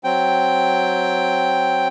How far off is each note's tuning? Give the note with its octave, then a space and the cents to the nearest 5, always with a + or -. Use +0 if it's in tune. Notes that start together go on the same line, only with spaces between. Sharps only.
F#3 +0 C4 +0 G5 +0